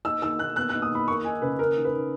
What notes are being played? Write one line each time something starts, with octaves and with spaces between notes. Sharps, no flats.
D#4 E6
D#3 E6
D#3 F#6
B3 F#6
F#6
D#4
D#6
D#3 B5
A#3 C#6
D#4 G#5
C#3 B4
C#4 A#4
D#3
B4
D#3